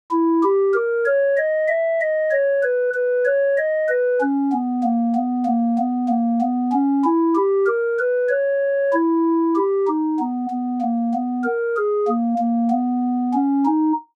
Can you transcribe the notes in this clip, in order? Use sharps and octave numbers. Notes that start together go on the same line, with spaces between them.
E4
G4
A#4
C#5
D#5
E5
D#5
C#5
B4
B4
C#5
D#5
B4
C#4
B3
A#3
B3
A#3
B3
A#3
B3
C#4
E4
G4
A#4
B4
C#5
E4
G4
D#4
B3
B3
A#3
B3
A#4
G#4
A#3
A#3
B3
C#4
D#4